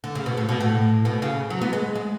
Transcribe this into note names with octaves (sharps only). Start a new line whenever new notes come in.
D3
C#3
B2
A2
B2
A2
B2
C#3
F#3
B3
G#3
G#3